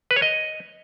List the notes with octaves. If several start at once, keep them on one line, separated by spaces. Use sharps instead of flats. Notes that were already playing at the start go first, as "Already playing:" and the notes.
B4
C#5
D#5